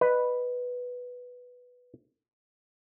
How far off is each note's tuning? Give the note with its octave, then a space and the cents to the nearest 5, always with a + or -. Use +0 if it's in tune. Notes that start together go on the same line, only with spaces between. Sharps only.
B4 +0 D#5 -25